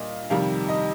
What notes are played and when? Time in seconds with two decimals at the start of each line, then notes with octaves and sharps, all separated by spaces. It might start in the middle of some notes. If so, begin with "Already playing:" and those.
Already playing: A#2 G3 D#5 F5
0.30 F2 C3 D#3 G3 F5
0.69 D#5